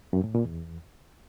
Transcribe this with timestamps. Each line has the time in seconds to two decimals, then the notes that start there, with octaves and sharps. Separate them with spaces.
0.13 F#2
0.24 A2
0.35 A#2
0.45 E2